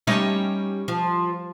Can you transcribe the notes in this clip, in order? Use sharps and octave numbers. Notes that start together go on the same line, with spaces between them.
G3 C#4 D#4
F3